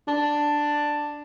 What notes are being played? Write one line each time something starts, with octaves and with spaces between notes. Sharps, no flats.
D4